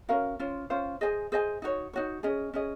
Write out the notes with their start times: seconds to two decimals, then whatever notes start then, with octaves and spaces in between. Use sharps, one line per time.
0.09 C#4 F#4 A#4 F5
0.39 C#4 F4 C5
0.70 C#4 F4 C5
1.01 G#4 C5 D#5 G#5
1.32 G#4 C5 D#5 G#5
1.62 D#4 F#4 C#5
1.93 D#4 F#4 C#5
2.23 C#4 G#4 D#5
2.54 C#4 G#4 D#5